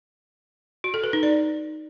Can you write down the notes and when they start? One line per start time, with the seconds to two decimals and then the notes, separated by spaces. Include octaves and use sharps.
0.84 F#4
0.94 A4
1.04 B4
1.13 D#4
1.23 D5